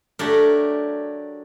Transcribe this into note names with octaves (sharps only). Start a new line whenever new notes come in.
F#3 A3 D4 G4 A#4